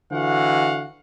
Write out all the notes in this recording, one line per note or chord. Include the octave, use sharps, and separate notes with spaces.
D3 E3 F#4 F5 F#5